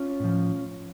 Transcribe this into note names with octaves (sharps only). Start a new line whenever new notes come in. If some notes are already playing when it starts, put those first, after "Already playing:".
Already playing: C#4 F4
A2 F3